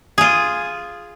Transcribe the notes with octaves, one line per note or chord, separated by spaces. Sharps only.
F4 G#4